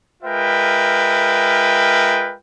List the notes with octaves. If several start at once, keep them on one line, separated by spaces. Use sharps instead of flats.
G#3 F4 A#4 B4 E5 G5